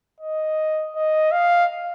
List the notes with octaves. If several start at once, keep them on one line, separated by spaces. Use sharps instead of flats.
D#5
D#5
F5